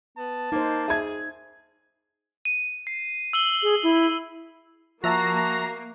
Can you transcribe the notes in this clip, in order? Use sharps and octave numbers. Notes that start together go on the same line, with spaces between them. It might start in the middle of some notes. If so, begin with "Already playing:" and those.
B3 A5
A#3 D#4 C5
G#4 E5 G#6
D#7
C7
E6 F#7 G7
G#4
E4
F3 A#3 F#4 E5 A5 A#5 C7